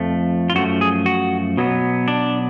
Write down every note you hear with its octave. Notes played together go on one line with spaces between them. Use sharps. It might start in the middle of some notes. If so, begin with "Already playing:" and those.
Already playing: F2 F3 A3
F4
F#2 F3 A3 F#4
G#4
F#4
B2 F#3 B3
D4